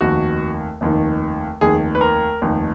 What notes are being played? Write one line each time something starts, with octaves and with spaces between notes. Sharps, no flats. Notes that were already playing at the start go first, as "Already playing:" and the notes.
F1 D#2 D#3 F#4
F1 D#2 D#3
F1 D#2 D#3 G#4
B4
A#4
F1 D#2 D#3